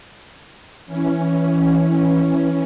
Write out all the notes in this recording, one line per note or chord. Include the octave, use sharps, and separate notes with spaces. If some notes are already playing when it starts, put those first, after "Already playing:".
E3 C#4